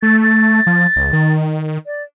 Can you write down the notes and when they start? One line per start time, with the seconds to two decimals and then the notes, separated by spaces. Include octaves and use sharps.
0.03 A3 A6
0.23 A6
0.67 F3
0.96 C#2
1.13 D#3
1.86 D5